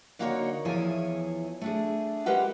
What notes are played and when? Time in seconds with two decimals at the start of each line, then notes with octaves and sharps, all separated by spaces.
0.19 D3 A#3 D#4 F#4 A#4 C#5
0.65 E2 F3 E4 G#4 C#5 G#5
1.61 A3 D4 G#4
2.26 G#3 G4 A#4 B4 F#5